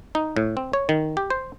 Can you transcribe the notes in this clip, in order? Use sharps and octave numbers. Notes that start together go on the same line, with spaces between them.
D#4
A2
C4
C#5
D#3
G4
C5